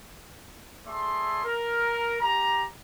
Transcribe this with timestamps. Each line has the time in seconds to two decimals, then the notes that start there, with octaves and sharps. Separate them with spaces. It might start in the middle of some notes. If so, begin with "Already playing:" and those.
0.86 A3 G#4 D5 E5 C6
1.44 A#4
2.21 G4 A#5